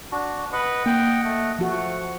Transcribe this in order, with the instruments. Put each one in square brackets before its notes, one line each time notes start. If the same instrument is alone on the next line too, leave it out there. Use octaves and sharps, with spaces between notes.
[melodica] D4 F#4
[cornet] B4 [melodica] D#5 F#5
[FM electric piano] A#3 [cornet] G5
[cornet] A3
[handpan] F3 F#4 [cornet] A3